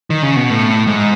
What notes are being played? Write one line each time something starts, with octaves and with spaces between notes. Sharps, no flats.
D#3
C#3
B2
A2
G#2